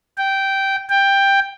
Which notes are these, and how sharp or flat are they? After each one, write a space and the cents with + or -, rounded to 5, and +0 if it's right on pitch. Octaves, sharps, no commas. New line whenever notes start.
G5 -10
G5 +10